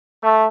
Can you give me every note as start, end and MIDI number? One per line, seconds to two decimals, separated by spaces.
0.23 0.45 57